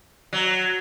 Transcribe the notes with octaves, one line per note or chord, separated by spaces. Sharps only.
F#3